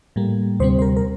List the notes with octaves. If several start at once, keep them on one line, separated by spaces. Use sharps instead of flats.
A2 G3 A#3
D2 C3 G3 C4 C5
C5
A#4
A#4